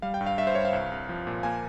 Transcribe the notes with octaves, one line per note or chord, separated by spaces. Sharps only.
G3 F5
G5
G2
F5
G2 E5
C5
G2 C#5
F5
C2
C2
F3
A#2
A#3 G#5